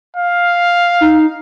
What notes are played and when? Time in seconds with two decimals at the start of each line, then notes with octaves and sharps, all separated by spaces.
0.17 F5
1.01 D#4